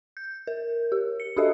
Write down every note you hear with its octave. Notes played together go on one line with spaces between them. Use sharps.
G6
A#4
G4
C#7
D4 F#4 G4 A4 D#5 E5